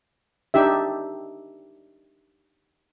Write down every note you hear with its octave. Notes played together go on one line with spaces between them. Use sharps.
D4 D#4 G4 E5